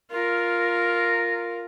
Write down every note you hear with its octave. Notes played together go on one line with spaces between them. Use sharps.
F4 A#4